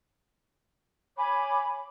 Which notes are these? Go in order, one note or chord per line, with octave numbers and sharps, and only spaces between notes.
C#5 G#5 B5 D6